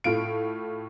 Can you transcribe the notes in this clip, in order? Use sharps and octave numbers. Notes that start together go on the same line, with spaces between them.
A2 F4 D7